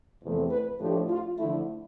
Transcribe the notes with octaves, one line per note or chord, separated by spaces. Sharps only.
E2 C3 F3 A3 C4
B4
A2 F3 A3 D4 G4
F4
D3 F3 A3 E4